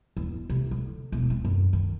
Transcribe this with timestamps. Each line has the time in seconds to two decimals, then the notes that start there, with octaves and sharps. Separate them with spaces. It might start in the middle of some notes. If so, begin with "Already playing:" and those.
0.17 E2
0.50 C3
0.71 D3
1.12 E1
1.30 C4
1.45 F#2
1.73 D#3